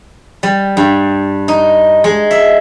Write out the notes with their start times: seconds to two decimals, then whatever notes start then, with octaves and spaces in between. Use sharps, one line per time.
0.43 G3
0.77 G2
1.48 D#4
2.04 G#3
2.31 E5